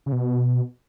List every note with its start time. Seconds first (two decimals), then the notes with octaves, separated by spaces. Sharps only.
0.06 C#3
0.12 B2